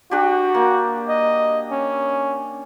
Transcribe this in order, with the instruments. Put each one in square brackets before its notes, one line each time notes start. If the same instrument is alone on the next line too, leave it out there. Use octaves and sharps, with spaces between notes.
[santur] D4 G4 [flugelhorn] F#4
[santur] A#3
[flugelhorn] D#5
C#4